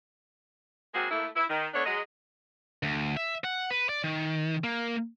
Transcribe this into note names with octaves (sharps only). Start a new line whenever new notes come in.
F#3 G#3 A#3 C4 F#4 G#4
A3 A#3 E4
E4
D#3
A3 B3 D4 C#5
F#3 G#3 D#5
D2
E5
F#5
B4
D5
D#3
A#3